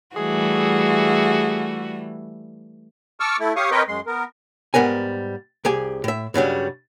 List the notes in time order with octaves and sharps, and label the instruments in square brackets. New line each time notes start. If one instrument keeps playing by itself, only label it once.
[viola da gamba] E3 G3 A3 [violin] F#4 [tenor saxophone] G#4
[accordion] A5 C#6 D6 E6 F6
A3 E4
G4 C#5 F5 C#6 D#6
C4 A#4 B4 C#5 D#5 G5
F#2 G#3 C6
B3 A#4
[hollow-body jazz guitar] G#2 G3 B3 A#4 G#5
C2 G4 G#4 G#5
A2 E5
G2 C#3 F#3 G3